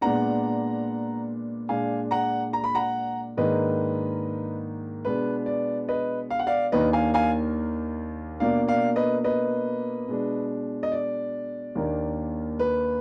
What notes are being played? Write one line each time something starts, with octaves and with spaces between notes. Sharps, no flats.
A#2 G#3 B3 D4 F#5 A#5
A#2 G#3 D4 F5 G#5
F#5 A#5
A#5
B5
F#5 A#5
G#2 D#3 A#3 D4 B4 D#5
B2 G#3 B3 D4 B4
D5
B4 D#5
F5
F#5
D5 F5
D#2 D#3 A#3 D4 B4 D#5
F5 G#5
F5 G#5
B2 A#3 D4 D5 F5
D5 F5
B4 D#5
B4 D#5
B2 G#3 D4
D#5
D5
D#2 D#3 A#3 D4
B4